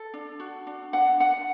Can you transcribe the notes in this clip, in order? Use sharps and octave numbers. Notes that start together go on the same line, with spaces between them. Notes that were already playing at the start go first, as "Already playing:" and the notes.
Already playing: A4
D4
F#4
D4
D4 F#5
D4 F#5